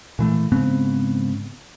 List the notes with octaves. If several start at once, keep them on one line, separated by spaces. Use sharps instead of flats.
A#2 E3 A3
G#2 C#3 B3 C4